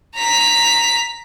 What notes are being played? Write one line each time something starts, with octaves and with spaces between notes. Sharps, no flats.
A#5 B6